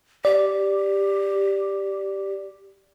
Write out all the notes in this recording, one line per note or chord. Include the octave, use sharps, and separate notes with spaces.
G4 D5